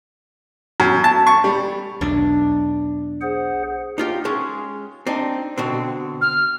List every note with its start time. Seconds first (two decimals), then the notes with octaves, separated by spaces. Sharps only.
0.80 F#2
1.04 A5
1.27 C#6
1.44 G3
2.01 B1 E2 D4
3.22 G#4 C5 F#5
3.98 D#4 F4 G4
4.25 G#3 C#4 G#4
5.07 C4 D4 D#4
5.58 B2 D3 C4
6.21 F6